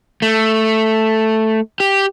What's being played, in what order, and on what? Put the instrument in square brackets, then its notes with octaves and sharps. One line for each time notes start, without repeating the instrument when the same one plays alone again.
[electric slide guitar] A3
G4